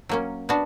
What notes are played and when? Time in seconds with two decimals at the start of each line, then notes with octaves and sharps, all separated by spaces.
0.09 F#3 A#3 C#4
0.49 B3 D4 F#4